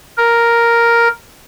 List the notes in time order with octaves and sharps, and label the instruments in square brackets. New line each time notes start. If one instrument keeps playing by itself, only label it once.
[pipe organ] A#4